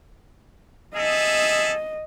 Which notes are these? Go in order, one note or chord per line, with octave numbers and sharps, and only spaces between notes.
G#4 A4 D#5 E5